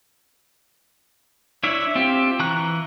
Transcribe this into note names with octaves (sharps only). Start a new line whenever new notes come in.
D4 E4 C#5 E5
C4 F4 G4
E3 A#5 C#6 F#6